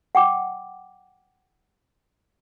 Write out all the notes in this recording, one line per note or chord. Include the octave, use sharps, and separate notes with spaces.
F#5 G5 D6